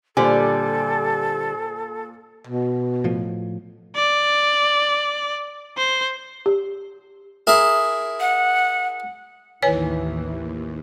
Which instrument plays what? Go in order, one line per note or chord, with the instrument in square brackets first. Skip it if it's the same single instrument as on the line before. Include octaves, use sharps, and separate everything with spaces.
[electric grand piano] A#2 C5 G#5 [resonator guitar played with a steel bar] D3 G3 G4 [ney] A4
[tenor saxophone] B2
[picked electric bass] A2 F3
[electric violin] D5
C5
[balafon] G4
[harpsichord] E4 G#4 A#4
[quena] F#5
[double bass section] A1 E3 [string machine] D#2 [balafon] B4 C#5 G#5